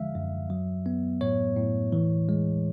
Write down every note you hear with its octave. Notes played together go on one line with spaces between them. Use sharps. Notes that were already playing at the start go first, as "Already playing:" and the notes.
Already playing: D3 F3 G#3 E5 F5
F#2
F#3
B3
A2 C#5
A2
E3
G#3